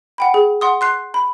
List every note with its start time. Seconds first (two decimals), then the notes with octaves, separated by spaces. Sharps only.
0.18 F#5 G5 B5
0.34 G#4
0.61 F#5 C6 D#6
0.81 C6 F#6 C7
1.14 B5